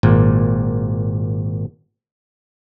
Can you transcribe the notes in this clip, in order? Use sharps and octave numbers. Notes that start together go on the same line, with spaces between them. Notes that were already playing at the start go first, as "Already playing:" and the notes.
G#1 A#2